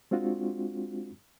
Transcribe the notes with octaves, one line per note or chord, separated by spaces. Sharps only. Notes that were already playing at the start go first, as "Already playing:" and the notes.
G#3 C4 D4 F4 F#4